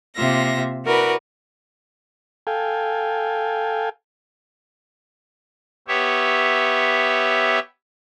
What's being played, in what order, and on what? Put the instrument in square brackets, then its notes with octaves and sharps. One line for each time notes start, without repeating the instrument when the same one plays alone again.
[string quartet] C3 A#3 F4 E5 A#6
E4 F#4 A#4 B4 D5
[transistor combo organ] A4 F5 G5 G#5
[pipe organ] B3 G4 C#5 E5